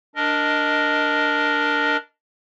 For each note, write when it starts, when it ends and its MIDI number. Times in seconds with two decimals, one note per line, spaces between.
0.16 1.97 62
0.16 1.97 70
0.16 1.97 75